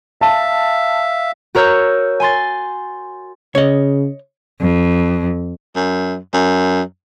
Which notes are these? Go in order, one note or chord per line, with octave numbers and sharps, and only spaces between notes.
E5 F5 A5
F#4 A#4 C#5 E6 G6
G#5 C6 A6
C#3 C#5 D#5
F2
F#2
F#2